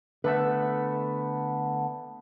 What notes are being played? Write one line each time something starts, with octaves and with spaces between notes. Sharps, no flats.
D3 A3 B3 B4 E5